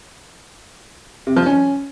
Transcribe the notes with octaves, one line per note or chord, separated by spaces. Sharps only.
C3
F3
C#4